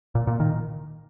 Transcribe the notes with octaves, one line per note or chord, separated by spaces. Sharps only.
A#2
A#2
D#3